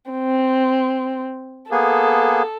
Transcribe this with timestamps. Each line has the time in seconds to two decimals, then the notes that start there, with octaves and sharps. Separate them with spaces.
0.11 C4
1.71 A#3 B3 G#4 A4